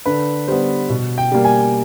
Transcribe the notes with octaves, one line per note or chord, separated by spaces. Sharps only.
D3 B4
G3 B3 C5
B2
G5
G3 A#3
G#5